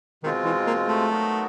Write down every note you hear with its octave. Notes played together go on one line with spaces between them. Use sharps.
B2 D#3 G#3 C4 F4
E3
A#3
A3
F#3 B3 D#4 F#4 A#4